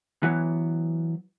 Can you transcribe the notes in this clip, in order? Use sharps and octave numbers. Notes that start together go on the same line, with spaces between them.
E3 F#3 B3